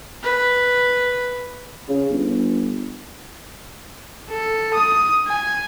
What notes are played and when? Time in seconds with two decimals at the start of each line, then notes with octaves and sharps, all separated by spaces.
0.23 B4
1.89 C#3
2.10 G1
4.30 A4
4.74 D#6
5.27 G#5